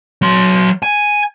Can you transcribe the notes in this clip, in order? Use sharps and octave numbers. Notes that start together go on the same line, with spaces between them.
F#3 C6
G#5